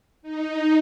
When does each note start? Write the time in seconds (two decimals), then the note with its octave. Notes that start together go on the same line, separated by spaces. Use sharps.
0.22 D#4